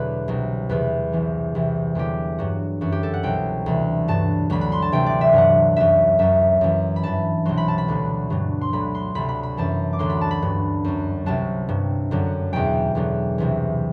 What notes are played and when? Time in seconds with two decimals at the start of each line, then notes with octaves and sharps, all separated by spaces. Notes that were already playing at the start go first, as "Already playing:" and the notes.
Already playing: E2 B2 D3 F#3 B4 D5
0.28 C2 B2 F#3
0.69 E2 C3 E3 B4
1.12 C2 C3 E3
1.55 C2 C3 E3
1.95 E2 D3 F#3 G4
2.38 G2 F#3 F#4
2.81 F#2 E3 F#4
2.92 G4
3.03 A4
3.14 F#5
3.23 C2 B2 F#3 G5
3.66 D2 C3 E3
4.08 G2 F#3 A5
4.50 D2 D3 F#3 B5
4.61 B5
4.72 C6
4.82 A5
4.92 D2 C3 E3 G5
5.06 D5
5.21 E5
5.33 G2 D3 F#3 F#5
5.76 F#2 F#3 E5
6.19 F#2 F#3 E5
6.61 F#2 E3
6.96 B5
7.03 G2 E3 A5
7.45 C2 B2 F#3 C6
7.57 B5
7.68 A5
7.78 B5
7.88 D2 D3 F#3
8.30 G2 D3 F#3
8.61 C6
8.73 D2 D3 F#3 B5
8.95 C6
9.15 D2 C3 F#3 B5
9.29 B5
9.43 B5
9.57 F#2 E3 A5
9.93 D6
9.99 D2 D3 F#3 C6
10.10 B5
10.21 A5
10.31 B5
10.42 G2 F#3
10.84 F#2 F#3
11.26 C2 C3 F#3 A5
11.69 G2 F#3
12.11 F#2 D3 F#3
12.53 E2 B2 F#3 G5
12.95 E2 D3 F#3
13.38 C2 C3 E3